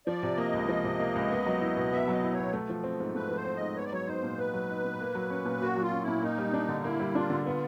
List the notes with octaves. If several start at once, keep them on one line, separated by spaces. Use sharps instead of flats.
F3 D5
C3
A#3 D#5
C#2
F3
C3
A#3
C#2
B3
F#3
E4
B2
B3 E5
F#3 D#5
E4
C#5
B2
A3
F3
C4
G#2
A3 B4
F3
C5
C4
G#2 D#5
B3 C#5
D5
F#3 C#5
D#4 C5
A#2
B3 B4
F#3
D#4
A#2
A#3
F#3
C#4
A#2
A#3 F#4
F#3
F4
C#4
E4
A#2
A#3 D#4
G3
D4
D3
A#3 E4
G3
D4 F4
D3
B3 F4